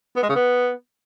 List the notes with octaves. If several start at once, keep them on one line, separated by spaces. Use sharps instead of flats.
B3
G#3
C#3
B3